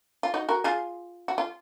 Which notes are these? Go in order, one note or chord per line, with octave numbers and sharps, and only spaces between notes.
F4
D#4 F#4
F#4 A#4
F4 G#4
F#4
F4